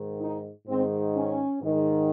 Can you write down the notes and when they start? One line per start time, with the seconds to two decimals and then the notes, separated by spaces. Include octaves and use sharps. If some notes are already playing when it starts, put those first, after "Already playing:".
Already playing: G#2 D#3
0.21 D#4
0.67 G#2 D#3 C4
1.14 C#4
1.61 G#2 D#3